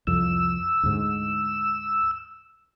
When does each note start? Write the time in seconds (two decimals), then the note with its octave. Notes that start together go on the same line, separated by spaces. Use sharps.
0.07 C2 F2 E6
0.83 D2 G#2